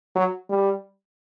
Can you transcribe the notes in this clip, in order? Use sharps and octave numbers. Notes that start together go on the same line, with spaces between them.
F#3
G3